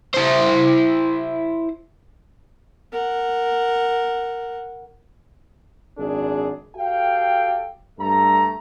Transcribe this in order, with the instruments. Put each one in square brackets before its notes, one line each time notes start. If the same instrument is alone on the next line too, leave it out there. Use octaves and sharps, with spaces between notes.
[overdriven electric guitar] E4 C5
[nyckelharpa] A#4 F#5
[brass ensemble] G#1 F#2 D4 G#4
F#4 G4 A4 F5 G5
G2 A3 A4 A#5